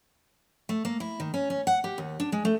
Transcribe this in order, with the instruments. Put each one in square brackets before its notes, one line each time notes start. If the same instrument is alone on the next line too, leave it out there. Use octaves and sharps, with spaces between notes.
[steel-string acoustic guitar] A3
A#3
E4
D#3
C#4
C#4
F#5
G4
D#2
D4
G#3
A3